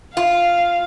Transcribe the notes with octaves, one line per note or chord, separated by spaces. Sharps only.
F4 F5